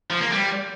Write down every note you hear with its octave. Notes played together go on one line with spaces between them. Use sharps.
F3
A#3
G3